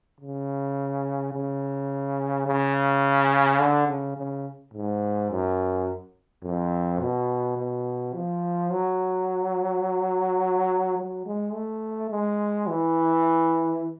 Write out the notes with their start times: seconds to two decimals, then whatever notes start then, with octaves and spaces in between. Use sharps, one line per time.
0.21 C#3
1.33 C#3
2.47 C#3
3.60 D3
3.88 C#3
4.17 C#3
4.74 G#2
5.31 F#2
6.44 F2
7.01 B2
7.57 B2
8.14 F3
8.71 F#3
10.98 F#3
11.26 G#3
11.54 A3
12.11 G#3
12.68 E3